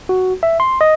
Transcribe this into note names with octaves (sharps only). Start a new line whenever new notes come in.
F#4
E5
C6
D#5